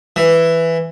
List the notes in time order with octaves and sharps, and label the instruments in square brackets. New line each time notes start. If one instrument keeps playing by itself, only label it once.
[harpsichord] E3